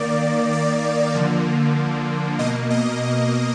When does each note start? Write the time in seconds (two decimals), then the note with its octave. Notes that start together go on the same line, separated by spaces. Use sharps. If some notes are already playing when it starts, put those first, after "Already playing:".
Already playing: D#3 A#3 D5
0.53 D5
1.15 D3 F3 A#3
2.39 B2 A#3 D#5
2.70 D#5